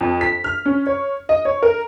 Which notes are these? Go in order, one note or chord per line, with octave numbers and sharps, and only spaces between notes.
F2
B6
F6
C#4
C#5
D#5
C#5
A#4